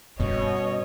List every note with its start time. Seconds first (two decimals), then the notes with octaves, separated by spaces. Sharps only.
0.20 G2 B2 C#4 C#5 D#5